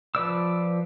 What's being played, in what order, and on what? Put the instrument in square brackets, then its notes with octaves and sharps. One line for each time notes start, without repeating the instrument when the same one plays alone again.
[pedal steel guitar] F3 B4 D5 E6